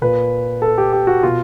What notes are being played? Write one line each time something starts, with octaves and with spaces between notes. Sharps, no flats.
A#2 B4
A4
G4
G4
F#4
B2 F4